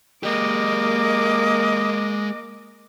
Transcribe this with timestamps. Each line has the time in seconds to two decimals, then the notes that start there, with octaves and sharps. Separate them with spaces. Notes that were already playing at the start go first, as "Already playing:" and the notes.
0.23 G#3 A#3 G4 D#5 D6